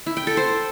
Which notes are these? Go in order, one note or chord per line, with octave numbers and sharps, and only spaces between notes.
E4
G5
A4
C5